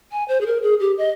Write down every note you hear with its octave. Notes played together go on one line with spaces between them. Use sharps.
G#5
C5
G#4
A#4
G#4
G4
D#5